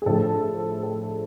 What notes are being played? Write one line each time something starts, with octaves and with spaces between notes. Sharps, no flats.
G#4
A2 F3 A3 D4 A4
A4